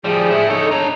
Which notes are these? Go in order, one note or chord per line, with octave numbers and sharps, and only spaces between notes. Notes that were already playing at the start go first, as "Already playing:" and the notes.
F3 G3 G#4
A3 E4
D#4 A4 C#5
D4 C#5 A#5